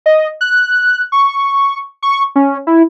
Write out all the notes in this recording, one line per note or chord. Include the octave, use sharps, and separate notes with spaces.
D#5
F#6
C#6
C#6
C#4
E4